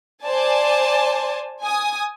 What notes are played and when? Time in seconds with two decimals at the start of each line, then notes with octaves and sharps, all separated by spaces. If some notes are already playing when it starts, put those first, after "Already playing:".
0.23 C5 D5 G#5 A5
1.62 G#5 D#6